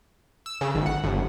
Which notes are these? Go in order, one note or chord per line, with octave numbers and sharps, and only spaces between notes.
E6
C#3
G#1
F#5
G1